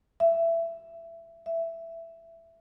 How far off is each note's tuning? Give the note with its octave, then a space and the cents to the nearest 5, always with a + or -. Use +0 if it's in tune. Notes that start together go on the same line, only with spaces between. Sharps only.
E5 +20
E5 +10